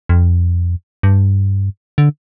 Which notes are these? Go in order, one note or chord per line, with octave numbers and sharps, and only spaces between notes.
F2
G2
D3